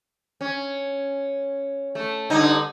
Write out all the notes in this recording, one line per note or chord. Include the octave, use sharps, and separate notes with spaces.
C#4
A3
G2 D3 D#4